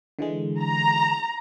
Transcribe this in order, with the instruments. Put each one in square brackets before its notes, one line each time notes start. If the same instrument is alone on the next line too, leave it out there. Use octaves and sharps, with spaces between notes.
[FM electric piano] D3 E3 G#3
[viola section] A#5